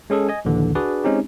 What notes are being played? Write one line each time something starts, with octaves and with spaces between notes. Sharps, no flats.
G#3 C#4 G#4 A4
D#5 G#5
A#1 D#2 D3 E3
D4 F#4 G#4 B4 D5
G#3 C4 C#4 D#4 G4